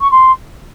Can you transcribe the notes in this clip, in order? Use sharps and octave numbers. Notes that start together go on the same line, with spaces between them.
C#6
C6